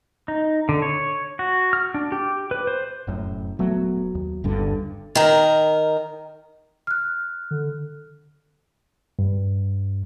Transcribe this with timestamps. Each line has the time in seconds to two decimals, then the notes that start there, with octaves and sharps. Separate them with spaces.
0.28 D#4
0.69 D3
0.82 C#5
1.39 F#4
1.73 F6
1.94 D4
2.12 G4
2.51 B4
2.67 C5
3.07 F1 F#2 A2
3.59 D#1 F#3 A3 B3
4.15 D#2
4.44 G1 G2 D3
5.15 D#3 A#4
6.87 F6 F#6
7.51 D3
9.19 G2